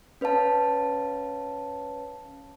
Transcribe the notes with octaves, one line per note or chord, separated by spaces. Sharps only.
C#4 B4 C#5 F5 A5